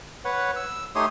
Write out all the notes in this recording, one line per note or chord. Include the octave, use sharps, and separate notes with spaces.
B4 C#5 F#5
E6
A3 D#4 G4 C#5 C6 D#6